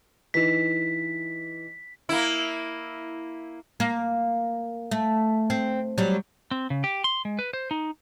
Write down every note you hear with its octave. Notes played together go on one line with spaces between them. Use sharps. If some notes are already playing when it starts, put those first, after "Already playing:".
E3 D#4 B6
A#3 E4
A#3
A3
C4
F#3 G3
C4
C#3
G4
C6
G#3
B4
C5
D#4